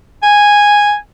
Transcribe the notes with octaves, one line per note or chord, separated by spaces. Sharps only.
G#5